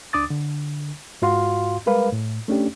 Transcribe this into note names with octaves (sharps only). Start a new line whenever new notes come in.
C#2 D4 D6 D#6 A6
D3
G#2 F4 F#4 F5 C6
G3 G#3 A#4 B4 F5
A2
A3 C#4 D4 G4